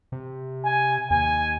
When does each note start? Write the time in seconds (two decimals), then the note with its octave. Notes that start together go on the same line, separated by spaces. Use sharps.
0.12 C3
0.65 G#5
1.10 D#2 G#5